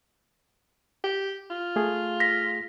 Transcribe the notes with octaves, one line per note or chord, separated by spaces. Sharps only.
G4
F4
A3 G#4
A#6 B6